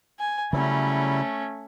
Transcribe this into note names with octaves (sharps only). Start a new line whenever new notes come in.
G#5
C#3 F#3 G3 A3 C#4 E4